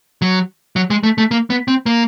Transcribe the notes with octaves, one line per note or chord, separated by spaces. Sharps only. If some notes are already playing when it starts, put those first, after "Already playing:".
F#3
F#3
G#3
A3
A3
A#3
B3
C4
A#3